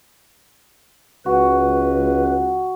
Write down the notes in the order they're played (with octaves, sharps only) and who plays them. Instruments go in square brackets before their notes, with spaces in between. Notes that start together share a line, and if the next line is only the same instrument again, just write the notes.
[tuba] C#2 [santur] F#4 [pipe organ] B4